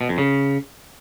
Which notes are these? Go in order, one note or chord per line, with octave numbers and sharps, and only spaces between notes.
B2
F2
C#3